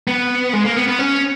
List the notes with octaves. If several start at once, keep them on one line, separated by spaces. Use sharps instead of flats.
B3
G#3
A#3
B3
B3
C#4